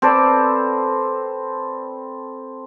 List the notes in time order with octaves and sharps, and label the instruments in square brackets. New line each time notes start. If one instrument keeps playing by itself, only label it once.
[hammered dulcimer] C4 A4 B4 D5